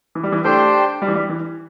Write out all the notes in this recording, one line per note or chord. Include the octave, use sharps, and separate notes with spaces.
E3
G3
E3
A3 D4 G4 C5 G5
G3
E3
G3
E3